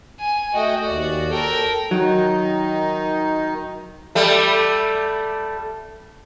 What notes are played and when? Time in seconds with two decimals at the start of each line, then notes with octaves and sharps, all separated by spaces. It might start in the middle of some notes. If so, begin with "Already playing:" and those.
0.20 G#5
0.55 A3 F#4 D#5 G5
0.87 D#2 D5
1.30 A4 A#4 G5
1.91 D#3 F#3 D#4
4.15 G3 A3